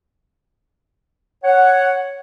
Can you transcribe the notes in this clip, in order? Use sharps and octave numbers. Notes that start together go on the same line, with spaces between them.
C#5 F#5